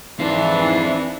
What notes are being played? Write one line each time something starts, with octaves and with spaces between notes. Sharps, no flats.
G#2 E3 C4 D4 D#4 F5